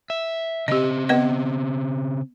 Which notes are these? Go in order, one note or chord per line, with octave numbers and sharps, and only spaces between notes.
E5
C#3 C4 G4 D#5
B3 B4 D#5